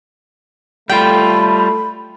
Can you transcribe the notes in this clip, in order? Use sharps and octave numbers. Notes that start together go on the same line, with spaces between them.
G3 A3 F4 G5 B5